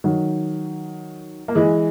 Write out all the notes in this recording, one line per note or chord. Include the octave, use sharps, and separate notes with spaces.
D#3 F#3
A#3
E3 G#3